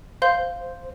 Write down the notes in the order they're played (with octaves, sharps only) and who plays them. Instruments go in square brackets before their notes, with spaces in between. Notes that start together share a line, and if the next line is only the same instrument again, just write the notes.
[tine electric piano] C5 [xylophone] F5 C6 G6